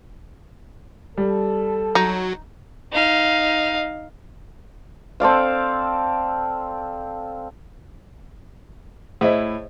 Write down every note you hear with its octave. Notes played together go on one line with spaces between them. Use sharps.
G3 A4
F#3 D#4
D#4 F5
C4 A4 D5 F5
A2 E4 G#4 C5 D#5